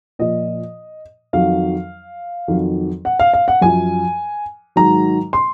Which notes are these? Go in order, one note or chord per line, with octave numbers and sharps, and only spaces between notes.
A#2 F3 D#5
F2 D#3 F#3 F5
F2 D#3 F#3
F#5
F5
F5
F#5
F#2 F3 G#5
G#2 D#3 F#3 A#5
C6